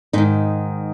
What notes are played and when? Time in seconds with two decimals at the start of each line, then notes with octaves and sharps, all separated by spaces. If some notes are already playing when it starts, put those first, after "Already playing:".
0.13 G#2 D#3 D#4